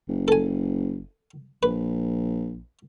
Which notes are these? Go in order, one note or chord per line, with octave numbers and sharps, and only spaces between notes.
F#1
A4 G#5
A#1 B4